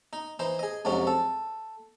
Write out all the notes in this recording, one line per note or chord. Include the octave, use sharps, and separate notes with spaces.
D#4
E3 D#4 C5
G#4 D#5
F2 G#2 C3 F#3 C#4
A4